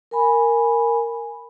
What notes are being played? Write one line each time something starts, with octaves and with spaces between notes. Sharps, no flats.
A#4 G#5 B5